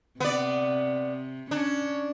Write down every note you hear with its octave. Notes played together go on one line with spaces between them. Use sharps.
C3 B3 D5
C#4 D4 C#5